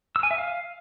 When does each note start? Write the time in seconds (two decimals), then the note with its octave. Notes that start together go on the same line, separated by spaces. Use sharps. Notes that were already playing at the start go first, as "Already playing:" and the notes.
0.16 E6
0.23 G#5
0.31 E5
0.38 F5